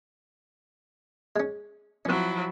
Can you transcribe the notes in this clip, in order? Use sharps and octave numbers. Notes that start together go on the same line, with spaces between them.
G#3 C#4
F3 F#3 C4 C#4 E4